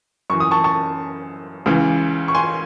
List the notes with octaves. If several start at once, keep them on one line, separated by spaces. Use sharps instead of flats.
F#2 E3 C#6
D#6
A5 C#6
A5 C#6
C#2 C#3 E3
C#6
G#5 C6